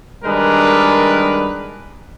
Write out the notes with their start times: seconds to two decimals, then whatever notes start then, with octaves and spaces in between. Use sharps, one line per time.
0.24 D#3 G3 G#3 D4 A#4 B4